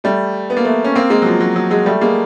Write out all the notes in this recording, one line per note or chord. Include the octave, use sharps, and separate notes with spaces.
G3 A3
B3
A#3
A3 B3
C#4
A#3 C4
G#3 A#3
F#3
F3
F#3
F#3
F#3 G#3
G3 A3
G#3 A#3